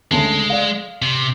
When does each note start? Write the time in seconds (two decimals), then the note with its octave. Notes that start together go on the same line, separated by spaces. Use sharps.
0.11 D2 C#3 G#3 A5
0.50 D5 F5
1.02 C3